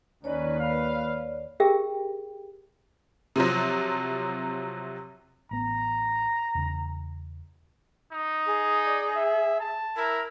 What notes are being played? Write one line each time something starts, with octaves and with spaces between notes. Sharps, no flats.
D#2 C#4 D#4 B4 C#5 D5
B4 F5
G4 G#4 A#4 E5 G5
C3 F3 F#3
A1 B3 A#5
E2 C#3
D#4
G#4
D5
E5
A5
E4 A#4